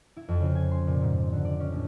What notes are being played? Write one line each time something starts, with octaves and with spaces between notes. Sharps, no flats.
E4
F2
C#3
G#5
C6
A#2
G#2
D3
D5
C#4
A1